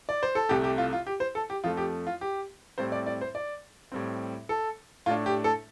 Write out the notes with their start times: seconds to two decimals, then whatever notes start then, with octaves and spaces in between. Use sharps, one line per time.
0.09 D5
0.23 C5
0.35 A4
0.49 C2 C3 A3 G4
0.64 G4
0.78 F4
0.93 F4
1.07 G4
1.20 C5
1.35 A4
1.50 G4
1.64 F2 F3 A3 F4
1.77 G4
2.07 F4
2.21 G4
2.78 A2 G3 C4 C5
2.92 D5
3.07 D5
3.21 C5
3.35 D5
3.92 A2 G3 C4
4.49 A4
5.06 A2 A3 D4 F4
5.26 G4
5.44 A4